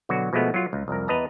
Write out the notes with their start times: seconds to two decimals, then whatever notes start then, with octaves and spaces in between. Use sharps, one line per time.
0.09 B2 D3 F#3 F#4
0.33 B2 F3 G#3 A3 B3
0.54 F#3 F4
0.73 C#2
0.88 C2 F2 A#4
1.08 E2 B4 D#5 A5 A#5